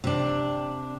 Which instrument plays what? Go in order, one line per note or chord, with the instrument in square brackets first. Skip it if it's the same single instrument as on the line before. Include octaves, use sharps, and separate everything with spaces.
[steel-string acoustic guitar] C3 D4